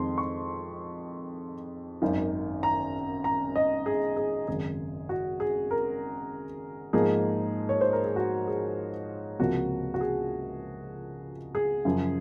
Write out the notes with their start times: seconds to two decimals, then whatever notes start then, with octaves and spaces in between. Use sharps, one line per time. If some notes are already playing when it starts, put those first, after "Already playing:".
Already playing: F2 D#3 G#3 C4 C6
0.18 C#6
2.02 G#1 F#2 D#3
2.63 A#5
3.24 A#5
3.56 D#5
3.86 G#4
4.17 G#4
4.48 G#1 F#2 C#3 G#3 G#4
5.09 F#4
5.40 G#4
5.71 A#4
6.93 G#2 F3 A#3 D#4 G#4
7.69 C#5
7.81 C5
7.93 A#4
8.04 G#4
8.16 F#4
8.47 G#4
9.39 C#2 C3 F3 A#3 F#4
9.94 F#4
10.01 G#4
11.55 G#4
11.85 F#2 C#3 F3